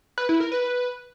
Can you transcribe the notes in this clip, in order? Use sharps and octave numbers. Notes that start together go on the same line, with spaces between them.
B4
E4
A#4
B4